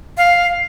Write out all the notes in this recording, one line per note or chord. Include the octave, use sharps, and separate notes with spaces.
F5